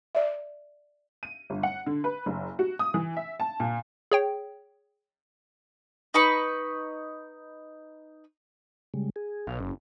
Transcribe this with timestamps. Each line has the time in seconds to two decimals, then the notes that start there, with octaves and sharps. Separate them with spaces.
0.15 D5 E5
1.23 D#7
1.50 G1
1.63 F#5
1.86 D3
2.04 B4
2.26 F#1
2.59 F#4
2.79 D#6
2.94 E3
3.17 E5
3.40 A5
3.60 A#2
4.11 G#4 C#5 G5
6.14 D#4 B4 B5 C#6
8.94 C#3 G3 G#3
9.16 G#4
9.47 B1 F5
9.60 F#1 C#4